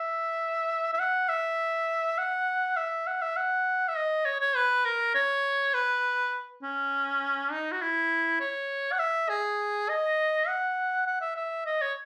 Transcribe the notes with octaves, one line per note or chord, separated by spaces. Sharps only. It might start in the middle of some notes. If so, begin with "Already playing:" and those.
Already playing: E5
E5
F#5
E5
F#5
E5
F#5
E5
F#5
E5
D#5
C#5
C#5
B4
A#4
C#5
B4
C#4
D#4
F#4
E4
C#5
F#5
E5
G#4
D#5
F#5
F#5
E5
E5
D#5
C#5